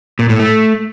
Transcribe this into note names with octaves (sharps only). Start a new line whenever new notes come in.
A#2
A2
A3